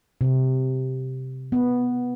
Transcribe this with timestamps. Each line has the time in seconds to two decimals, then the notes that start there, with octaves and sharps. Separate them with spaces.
0.21 C3
1.52 B3